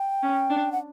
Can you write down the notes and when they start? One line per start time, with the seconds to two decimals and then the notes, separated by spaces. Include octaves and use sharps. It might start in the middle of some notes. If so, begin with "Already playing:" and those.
Already playing: G5
0.23 C#4
0.50 D4
0.72 F#5